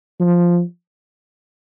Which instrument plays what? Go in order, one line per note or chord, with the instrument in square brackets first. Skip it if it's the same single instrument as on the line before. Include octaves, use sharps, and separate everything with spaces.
[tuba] F3